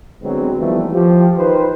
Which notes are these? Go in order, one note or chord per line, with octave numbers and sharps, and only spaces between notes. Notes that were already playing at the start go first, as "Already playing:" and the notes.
D3 F#3 G#3 B3 C4
D#2 E3 F3 G3 A3 B3
F3 G4
D#3 B4 C5